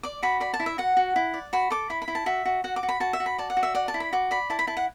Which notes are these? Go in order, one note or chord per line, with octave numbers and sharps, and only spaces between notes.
D5 D6
F#4 B5
D5 B5
A5
E4
E5
F#4 F#5
F#4
E4
D5
F#4 B5
A4 D6
E4 B5
B5
E4
A5
F#4 E5
F#4
F#4 F#5
D6
F#4
B5
F#4 A5
E5
F#4
B5
D5 A5
F#5
F#4
E5
D5 F#5
A5
E4
B5
F#4 D6
D5 B5
E4 A5
B5
E4 A5
F#5